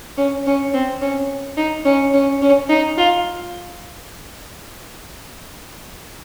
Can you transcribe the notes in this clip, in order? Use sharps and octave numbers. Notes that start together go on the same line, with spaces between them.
C#4
C#4
C4
C#4
D#4
C#4
C#4
C#4
D#4
F4